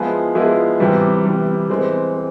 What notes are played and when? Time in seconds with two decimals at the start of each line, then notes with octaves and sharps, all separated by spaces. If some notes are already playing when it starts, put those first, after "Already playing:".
Already playing: F3 G#3 B3 E4 G#4
0.35 F3 G#3 B3 E4 G#4
0.80 C3 E3 G3
1.25 C3 E3 G3
1.69 E3 G#3 C4
2.14 C4